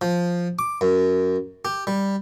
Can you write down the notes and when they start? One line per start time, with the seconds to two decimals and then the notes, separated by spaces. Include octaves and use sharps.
0.01 F3
0.59 D6
0.81 F#2
1.65 G4
1.87 G3